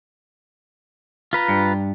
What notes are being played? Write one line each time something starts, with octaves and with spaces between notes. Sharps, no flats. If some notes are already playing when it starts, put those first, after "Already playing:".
F4 B4 A#5
G2